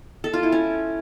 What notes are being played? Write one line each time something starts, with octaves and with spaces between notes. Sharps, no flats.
A4
F4
E4
C#4